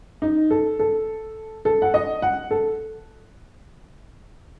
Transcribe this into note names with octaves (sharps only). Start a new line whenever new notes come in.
D#4
A4
A4
A4
F#5
D#5
F#5
A4